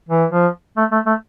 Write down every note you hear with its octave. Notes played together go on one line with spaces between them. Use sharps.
E3
F3
A3
A3
A3